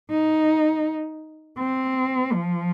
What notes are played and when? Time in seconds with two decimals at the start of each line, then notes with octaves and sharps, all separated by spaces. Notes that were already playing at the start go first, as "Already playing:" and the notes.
0.10 D#4
1.58 C4
2.32 F3